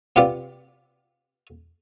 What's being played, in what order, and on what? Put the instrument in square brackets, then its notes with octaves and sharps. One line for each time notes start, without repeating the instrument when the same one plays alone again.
[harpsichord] C3 B3 F4 G4 D5